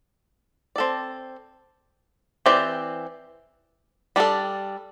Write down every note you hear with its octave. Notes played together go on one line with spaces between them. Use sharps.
C4 A4 D5
E3 C4 G4 D5
G3 D4 A4